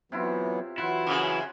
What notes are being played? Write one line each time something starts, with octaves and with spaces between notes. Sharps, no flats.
C3 E3 F#3 B3 E4 F4
E3 F#3 E4 F4 F#5
F#2 C#3